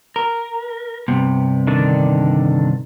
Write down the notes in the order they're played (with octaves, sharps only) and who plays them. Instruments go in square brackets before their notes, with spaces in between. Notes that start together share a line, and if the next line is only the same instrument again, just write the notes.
[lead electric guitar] A#4
[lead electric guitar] G2 C3 [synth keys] B3
[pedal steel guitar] D3 D#3 D4